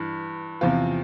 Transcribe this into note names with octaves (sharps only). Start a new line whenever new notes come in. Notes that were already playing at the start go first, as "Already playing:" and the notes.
Already playing: G2 E3
E2 C3 F3 C4 F4